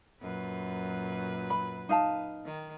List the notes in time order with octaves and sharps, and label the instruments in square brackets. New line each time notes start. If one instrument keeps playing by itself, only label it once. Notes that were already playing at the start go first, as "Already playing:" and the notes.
[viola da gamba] F#2 A#2 B4
[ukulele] B5
D#4 F5 A5
[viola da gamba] D#3